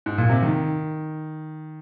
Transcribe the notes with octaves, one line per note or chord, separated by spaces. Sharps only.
G#2
A#2
C3
D#3